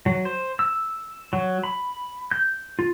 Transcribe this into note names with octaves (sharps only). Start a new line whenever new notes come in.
F#3
C5
E6
F#3
B5
G6
F4